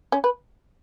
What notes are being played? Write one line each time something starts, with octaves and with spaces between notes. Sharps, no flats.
C#4
B4